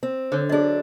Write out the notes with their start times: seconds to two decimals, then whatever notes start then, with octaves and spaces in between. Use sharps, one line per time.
0.03 C4
0.32 D3 C5 C#5
0.49 F#3 D4 G#4 D#5